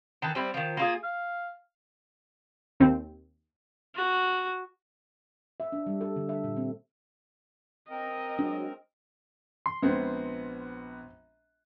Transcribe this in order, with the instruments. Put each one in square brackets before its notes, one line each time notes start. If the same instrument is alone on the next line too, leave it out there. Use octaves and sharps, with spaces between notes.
[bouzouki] D#3 E3 A4
G3 C4 E4
D#3 F3
A#3 F4 G#4
[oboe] F5
[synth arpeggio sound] D#2 C4
[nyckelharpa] F#4
[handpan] E5
D4
G3
A4
D3
E5
A#2
C4
[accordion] C4 A#4 [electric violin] D#5
[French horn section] F#3 G#3 F#4 [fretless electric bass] D4
[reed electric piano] C6
[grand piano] A#1 B3 [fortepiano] G#3 C4